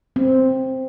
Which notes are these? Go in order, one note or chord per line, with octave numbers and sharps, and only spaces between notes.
C4